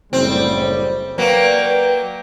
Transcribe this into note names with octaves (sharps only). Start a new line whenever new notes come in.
F#1 A2 G3 C4
F#3 A#3 B4 D5 G5